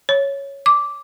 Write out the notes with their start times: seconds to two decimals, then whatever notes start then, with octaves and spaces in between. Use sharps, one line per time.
0.09 C#5
0.66 D6